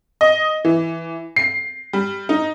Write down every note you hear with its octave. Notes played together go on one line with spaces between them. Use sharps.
D#5
E3
C7
G3
D#4